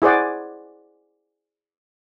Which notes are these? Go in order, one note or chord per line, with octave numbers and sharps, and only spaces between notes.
E4 G#4 C5 D5 F#5